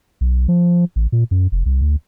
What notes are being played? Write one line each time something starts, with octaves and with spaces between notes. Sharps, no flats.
B1
F3
A1
A#2
F#2
F1
C2
D2